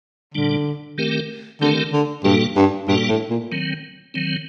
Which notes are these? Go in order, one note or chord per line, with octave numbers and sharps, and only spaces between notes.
A#2 D3 G3 D4
D#3 A3 C4 G4 A#4
D3 D#3 A3 C4 G4 A#4
D3
G2 A#2 G3 A#3 F#4 A4
G2
G2 A#2 G3 A#3 F#4 A4
A2
A#2
D#3 F#3 C4
D#3 F#3 C4